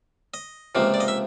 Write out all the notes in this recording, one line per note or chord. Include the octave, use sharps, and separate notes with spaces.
D#5
C#2 C3 F3 A#3
D5
D#5
E5